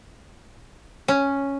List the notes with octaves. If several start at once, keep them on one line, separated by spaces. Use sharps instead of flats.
C#4